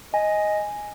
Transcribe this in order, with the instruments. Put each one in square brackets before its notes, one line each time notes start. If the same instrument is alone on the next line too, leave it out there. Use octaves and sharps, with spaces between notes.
[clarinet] D#5 [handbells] G#5